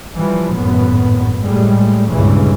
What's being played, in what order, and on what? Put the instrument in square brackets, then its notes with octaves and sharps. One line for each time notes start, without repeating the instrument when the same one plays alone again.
[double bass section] E3 F3 G3
G#1 F#2 A2 B3
A2 G3 G#3
G1 C#2 G2 A#2 C#3 E3